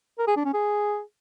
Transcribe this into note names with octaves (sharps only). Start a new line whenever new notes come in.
A#4
G#4
D4
C#4
G#4